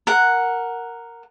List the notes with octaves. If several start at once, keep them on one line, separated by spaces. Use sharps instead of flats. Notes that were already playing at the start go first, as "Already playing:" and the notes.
A#4 F#5